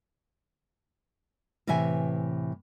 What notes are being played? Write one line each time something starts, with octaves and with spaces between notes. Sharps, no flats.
A2 C3 E3 E5 G#5